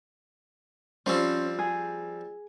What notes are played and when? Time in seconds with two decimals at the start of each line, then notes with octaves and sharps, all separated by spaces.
1.06 F3 G3 C4 C#4 C5
1.59 G#4